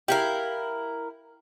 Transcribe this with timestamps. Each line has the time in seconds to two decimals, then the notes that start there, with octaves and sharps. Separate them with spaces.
0.08 E4 F4 G4 A#4 F5